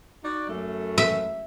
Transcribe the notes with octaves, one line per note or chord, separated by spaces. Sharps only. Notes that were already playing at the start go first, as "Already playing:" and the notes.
D#4 F#4 D5
F#2 A3
E5